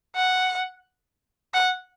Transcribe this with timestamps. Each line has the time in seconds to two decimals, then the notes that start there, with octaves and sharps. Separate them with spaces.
0.16 F#5
1.54 F#5